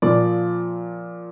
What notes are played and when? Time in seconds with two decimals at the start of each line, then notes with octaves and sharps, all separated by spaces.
0.02 A#2 F3 D5